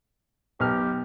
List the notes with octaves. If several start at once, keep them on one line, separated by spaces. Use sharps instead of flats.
B1 G4 F6